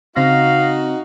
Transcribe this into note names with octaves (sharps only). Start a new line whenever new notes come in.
C#3 C4 D#4 F#4 F5 A#6